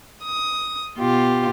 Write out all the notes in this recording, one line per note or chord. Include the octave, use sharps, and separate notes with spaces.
D#6
B2 F4 G4